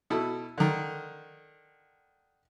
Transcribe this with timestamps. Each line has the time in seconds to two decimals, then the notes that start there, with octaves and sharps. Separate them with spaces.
0.10 B2 E4 A4
0.58 D3 D#3